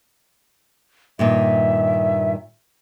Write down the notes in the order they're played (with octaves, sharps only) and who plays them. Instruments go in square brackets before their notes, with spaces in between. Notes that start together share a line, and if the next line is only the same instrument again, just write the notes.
[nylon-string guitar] G2 A#2 D#3 [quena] E5